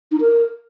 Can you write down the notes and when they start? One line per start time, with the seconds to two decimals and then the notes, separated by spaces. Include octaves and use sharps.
0.11 D#4
0.21 A#4